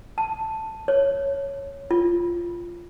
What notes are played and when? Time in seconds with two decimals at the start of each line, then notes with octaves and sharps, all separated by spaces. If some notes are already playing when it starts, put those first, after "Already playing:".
0.18 A5
0.88 C#5
1.91 F4